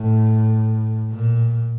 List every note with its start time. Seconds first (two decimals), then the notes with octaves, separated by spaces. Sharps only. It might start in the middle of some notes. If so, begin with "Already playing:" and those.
Already playing: A2
1.11 A#2